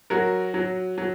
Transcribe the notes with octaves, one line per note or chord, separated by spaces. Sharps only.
F#3 F#4 A#4
F#3
F#3